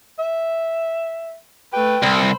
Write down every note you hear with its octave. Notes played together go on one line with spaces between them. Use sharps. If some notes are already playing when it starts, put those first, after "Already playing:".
E5
A3 B4 G5
C2 C5 B5